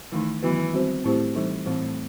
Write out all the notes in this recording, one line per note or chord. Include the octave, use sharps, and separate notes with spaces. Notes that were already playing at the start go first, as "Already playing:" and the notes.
D#3 E3 A3 D#4
D#3 E3 F#3 B3 F#4 B4
G3 C4 F#4 C5
A2 C4 E4 G4 C5
E3 G3 D#4 A4
A2 E3 A3 C4